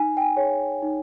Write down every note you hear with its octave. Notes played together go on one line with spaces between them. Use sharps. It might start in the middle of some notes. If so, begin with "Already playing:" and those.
Already playing: D#4 G#5
G5
G#5
G#4 C#5
D#4